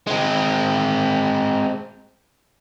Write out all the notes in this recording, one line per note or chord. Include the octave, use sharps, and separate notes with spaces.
G#3 C4